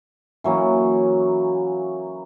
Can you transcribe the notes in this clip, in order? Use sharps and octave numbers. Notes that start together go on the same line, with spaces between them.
E3 F#3 A#3 C#4